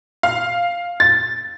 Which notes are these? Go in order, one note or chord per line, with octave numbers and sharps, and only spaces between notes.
F5
A6